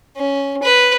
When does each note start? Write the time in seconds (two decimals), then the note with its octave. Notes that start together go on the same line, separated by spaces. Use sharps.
0.17 C#4
0.63 B4